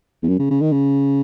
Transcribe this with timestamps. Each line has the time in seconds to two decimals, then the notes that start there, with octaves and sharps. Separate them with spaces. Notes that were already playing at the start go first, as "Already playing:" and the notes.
0.23 E2
0.28 F#2
0.39 C#3
0.50 C#3
0.61 D#3
0.72 C#3